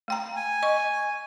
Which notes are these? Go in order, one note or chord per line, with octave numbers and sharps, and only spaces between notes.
A3 G5 A#5
G#5
D#5 C#6